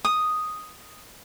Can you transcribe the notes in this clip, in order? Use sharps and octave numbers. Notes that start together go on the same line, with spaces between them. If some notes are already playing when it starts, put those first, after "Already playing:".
D#6